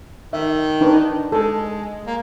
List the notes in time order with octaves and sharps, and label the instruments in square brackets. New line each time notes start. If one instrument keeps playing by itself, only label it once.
[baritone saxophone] D#3 [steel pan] E5
[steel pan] D4 D#4 B4
[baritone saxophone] G#3 [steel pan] A4
[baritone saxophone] A#3